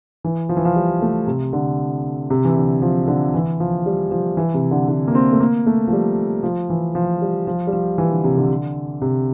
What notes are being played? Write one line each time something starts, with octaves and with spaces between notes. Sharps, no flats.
E3
F3
E3
F3
G3
A3
C3
D3
C3
E3
D3
F3
D3
E3
F3
G3
F3
E3
C3
D3
D3
A#3
C4
A3
A#3
A3
F3
G3
F3
E3
F3
G3
F3
G3
F3
E3
D3
C3
D3
C3